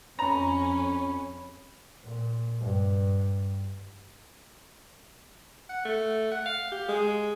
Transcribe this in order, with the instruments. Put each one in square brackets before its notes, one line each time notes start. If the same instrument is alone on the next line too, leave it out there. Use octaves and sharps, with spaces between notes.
[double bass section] F2 [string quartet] C#4 [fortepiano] A#5 [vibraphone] B5
[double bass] A#2
G2
[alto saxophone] F#5
A3
F#5
F5
G4
G#3